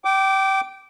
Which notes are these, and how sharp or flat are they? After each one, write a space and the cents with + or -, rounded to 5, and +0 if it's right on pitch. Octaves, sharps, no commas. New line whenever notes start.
G5 -25 D6 +0